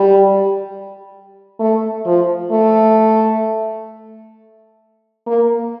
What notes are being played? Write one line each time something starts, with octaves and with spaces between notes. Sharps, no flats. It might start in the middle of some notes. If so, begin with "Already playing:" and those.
Already playing: G3
A3
F3
A3
A#3